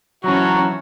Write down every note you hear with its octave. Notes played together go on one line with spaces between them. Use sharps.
E3 F#3 C#4 F#4 C#5 E5 A5 A#5